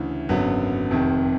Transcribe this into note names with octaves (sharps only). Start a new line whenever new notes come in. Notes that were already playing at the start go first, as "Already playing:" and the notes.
Already playing: D2 C#3 E3
G#1 F#2 D3 F#3 B3
F1 F2 C3 D#3